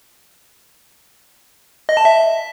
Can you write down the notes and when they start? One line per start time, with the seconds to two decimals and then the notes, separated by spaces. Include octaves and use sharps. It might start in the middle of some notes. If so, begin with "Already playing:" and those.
1.89 D#5
1.97 A5
2.05 E5